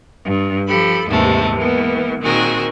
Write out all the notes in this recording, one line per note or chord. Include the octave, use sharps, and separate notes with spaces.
G2
F3 G4 A4 B5
D#2 G#2 C3 E3 A3
E3 G#3 A#3 B3
A#2 D#3 C4 F#4 G#4 A#4